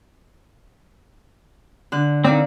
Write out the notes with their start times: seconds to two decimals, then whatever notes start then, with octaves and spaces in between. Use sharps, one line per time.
1.92 D3 F#6
2.24 D#3 C4 D5 F5